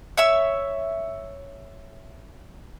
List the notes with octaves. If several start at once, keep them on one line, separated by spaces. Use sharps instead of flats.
C#5 E5 E6